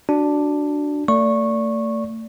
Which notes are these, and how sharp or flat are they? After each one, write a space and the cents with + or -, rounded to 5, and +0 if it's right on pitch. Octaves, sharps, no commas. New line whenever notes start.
D4 +0 F#4 +0
A3 +35 D5 -20 C#6 -15